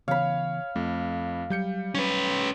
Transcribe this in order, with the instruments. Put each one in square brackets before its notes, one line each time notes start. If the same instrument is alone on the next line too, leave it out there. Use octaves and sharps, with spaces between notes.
[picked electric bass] C#3 E3 B3 [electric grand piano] C#5 [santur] F5 B5
[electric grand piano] F2 [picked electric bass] A3
[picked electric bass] F#3 [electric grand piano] G3 G6 C#7
[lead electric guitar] C#4 B4